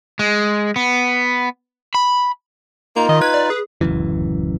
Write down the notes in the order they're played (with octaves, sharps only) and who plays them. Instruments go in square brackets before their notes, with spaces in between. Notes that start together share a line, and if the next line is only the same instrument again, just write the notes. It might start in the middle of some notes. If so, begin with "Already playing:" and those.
[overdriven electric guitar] G#3
B3
B5
[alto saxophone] A#3 [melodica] D#4 F4 [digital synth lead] A#5
[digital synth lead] D#3 [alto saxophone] D#5
[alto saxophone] B4 [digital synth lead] G#6
[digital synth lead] D5
G#4
[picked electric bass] D1 C#2 F#2 E3